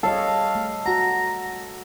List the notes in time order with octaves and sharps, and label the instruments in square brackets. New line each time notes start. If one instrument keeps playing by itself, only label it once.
[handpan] G3 C#5 D#5 [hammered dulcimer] A4 [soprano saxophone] F5
[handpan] A3
[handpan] F#4 F#5 [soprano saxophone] A#5